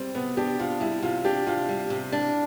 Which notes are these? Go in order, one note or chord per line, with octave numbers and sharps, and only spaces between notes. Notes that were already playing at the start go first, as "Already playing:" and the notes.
Already playing: G3 C4
C3 B3
D4 G4
C3 F4
G3 E4
C3 F4
D4 G4
C3 F4
G3
C3
D4